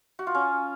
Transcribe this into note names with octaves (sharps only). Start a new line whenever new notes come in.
F#4
F4
C#4